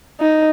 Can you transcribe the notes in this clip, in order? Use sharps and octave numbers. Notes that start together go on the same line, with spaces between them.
D#4